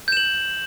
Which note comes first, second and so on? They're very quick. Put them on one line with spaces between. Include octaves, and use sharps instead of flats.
G6 E7 F#7